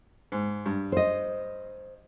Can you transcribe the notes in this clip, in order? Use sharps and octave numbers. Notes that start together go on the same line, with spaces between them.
G#2
G2
C5 D#5